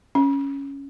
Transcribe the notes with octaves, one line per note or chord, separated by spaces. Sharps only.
C#4